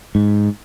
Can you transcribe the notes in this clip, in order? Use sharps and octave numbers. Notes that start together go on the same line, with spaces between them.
G#2